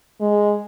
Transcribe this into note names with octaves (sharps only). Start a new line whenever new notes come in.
G#3